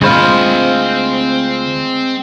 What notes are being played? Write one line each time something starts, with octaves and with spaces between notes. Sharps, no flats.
D2 G#3 C4 F4 C5 B5